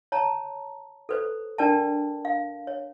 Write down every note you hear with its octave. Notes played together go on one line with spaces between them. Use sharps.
C#5 A5 A#5
A4 B4 C5
D4 A#4 D5 G5 A5
F5
C#5